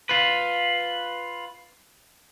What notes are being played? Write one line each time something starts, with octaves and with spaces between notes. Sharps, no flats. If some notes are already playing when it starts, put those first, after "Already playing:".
F4 B4